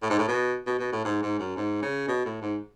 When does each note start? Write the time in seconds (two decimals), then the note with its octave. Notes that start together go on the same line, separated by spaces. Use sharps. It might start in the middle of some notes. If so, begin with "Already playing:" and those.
0.02 A2
0.10 G#2
0.19 A2
0.28 B2
0.67 B2
0.79 B2
0.92 A2
1.05 G#2
1.23 G#2
1.39 F#2
1.57 G#2
1.82 C#3
2.08 B2
2.25 A2
2.42 G#2